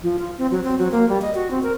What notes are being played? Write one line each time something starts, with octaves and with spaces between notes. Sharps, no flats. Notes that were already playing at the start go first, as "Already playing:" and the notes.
F3
F4
C4
F#3
C4
F#3
A#3
G3
D#5
F#4
C4
A#4